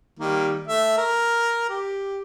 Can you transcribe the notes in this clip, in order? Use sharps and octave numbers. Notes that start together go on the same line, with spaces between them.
D#3 G3 A#3
A3 E5
A#4
G4